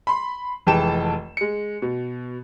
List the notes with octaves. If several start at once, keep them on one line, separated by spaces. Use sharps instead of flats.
B5 C6
F1 E3 G#3 G5 A5 E7
G#3 C#7
B2